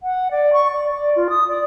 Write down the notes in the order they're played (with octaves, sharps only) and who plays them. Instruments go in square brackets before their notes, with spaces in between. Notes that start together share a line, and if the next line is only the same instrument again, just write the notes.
[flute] F#5
D5
C#6
D5
D5
F4
D#6
D5